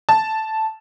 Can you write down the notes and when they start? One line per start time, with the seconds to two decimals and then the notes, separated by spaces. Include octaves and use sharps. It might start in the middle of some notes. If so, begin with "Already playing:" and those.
0.09 A5